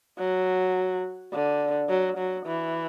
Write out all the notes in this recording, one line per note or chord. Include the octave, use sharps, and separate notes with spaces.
F#3
D3
F#3
F#3
E3